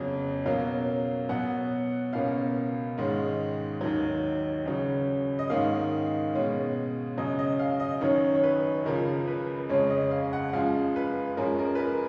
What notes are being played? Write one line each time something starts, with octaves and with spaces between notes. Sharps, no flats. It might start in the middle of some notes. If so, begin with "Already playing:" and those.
Already playing: F2 C#3 F#3 B3 G#4
B2 F#3 A#3 C#4 F5
B2 F#3 B3 F#5
C#2 B2 A#3 C#4 F5
G#2 D#3 G#3 C#4
D#2 D#3 F#3
C#2 C#3 F#3
D#5
G#2 D#3 A#3 C#4 F5
B2 G#3 C#4
F#2 C#3 F#3 D#5
D#5
F5
D#5
F#2 D#3 F#3 C#4 C#5
C#5
B4
C#2 C#3 F3 A#4
B4
F2 C#3 G#3 C#4 C#5
D#5
F5
F#5
F#2 F3 G#3 F5
B4
F#2 F3 G#3 C#4 A#4
A#4
B4
A#4